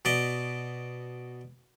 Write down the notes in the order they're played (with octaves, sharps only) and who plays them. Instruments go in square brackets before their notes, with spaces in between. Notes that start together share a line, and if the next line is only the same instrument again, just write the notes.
[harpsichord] B2 D5 D#5